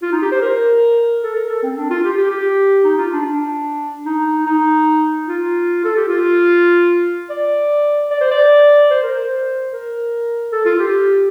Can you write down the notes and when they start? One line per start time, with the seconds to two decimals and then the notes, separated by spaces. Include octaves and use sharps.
0.02 F4
0.12 D#4
0.22 G4
0.32 C5
0.42 A#4
1.23 A4
1.36 A#4
1.49 A4
1.63 C4
1.76 D4
1.90 F4
2.04 G4
2.17 G4
2.30 G4
2.84 D#4
2.97 F4
3.12 D4
3.26 D4
4.05 D#4
4.46 D#4
5.27 F4
5.85 A4
5.96 G4
6.08 F4
7.30 D5
8.10 D5
8.21 C5
8.31 D5
8.90 C5
9.03 A#4
9.12 C5
9.72 A#4
10.52 A4
10.65 F4
10.79 G4